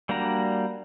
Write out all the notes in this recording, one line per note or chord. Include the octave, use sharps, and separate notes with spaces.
G3 A#3 D4 F#4 A#5